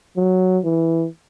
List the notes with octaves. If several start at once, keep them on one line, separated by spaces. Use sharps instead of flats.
F#3
E3